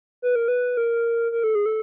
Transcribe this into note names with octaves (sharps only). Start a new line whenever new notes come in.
B4
A#4
B4
A#4
A#4
A4
G#4
A4